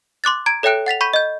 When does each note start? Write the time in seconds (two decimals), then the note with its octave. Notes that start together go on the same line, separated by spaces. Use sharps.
0.24 C6 D6 F#6 A6
0.46 A#5 G#6 D7
0.63 A4 C#5 E5 G5 F#6 D7
0.86 F#5 A6 B6 F7
1.01 B5 C#6 G6 B6 D#7
1.14 D#5 G6